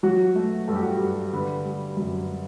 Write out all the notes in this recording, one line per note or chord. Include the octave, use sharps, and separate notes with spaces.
F#3 F#4
A3
G2 A4
G4
F#4
G4
G2
D3 B4
G3
F#2